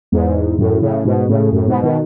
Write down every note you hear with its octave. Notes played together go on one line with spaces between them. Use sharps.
E2 G#2
F#2 A2
A2 C#3
G#2 B2
A2 C#3
F#2 A2
G#2 B2
B2 D#3